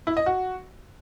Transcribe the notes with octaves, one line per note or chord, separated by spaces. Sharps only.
E4
D#5
F#4